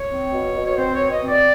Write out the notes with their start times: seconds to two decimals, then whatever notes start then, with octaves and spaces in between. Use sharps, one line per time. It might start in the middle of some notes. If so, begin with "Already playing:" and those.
Already playing: C#5
0.09 C4
0.32 B2
0.55 B2
0.66 C#5
0.78 C4 C5
0.95 B2 C#5
1.11 D#5
1.23 C4
1.28 D5